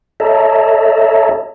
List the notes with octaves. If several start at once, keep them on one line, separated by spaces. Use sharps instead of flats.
A4 C#5 D#5 E5 A5 A#5